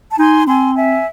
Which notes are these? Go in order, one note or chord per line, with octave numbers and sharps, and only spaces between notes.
A5
D#4 G#5 C6
C4 G#5 C6
E5 G#5